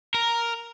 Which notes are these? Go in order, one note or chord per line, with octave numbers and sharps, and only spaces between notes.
A#4